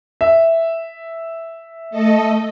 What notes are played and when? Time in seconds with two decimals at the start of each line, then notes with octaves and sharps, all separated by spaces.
0.21 E5
1.91 A3 A4 D#5